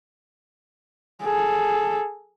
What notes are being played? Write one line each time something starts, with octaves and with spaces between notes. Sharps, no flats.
G#4 A4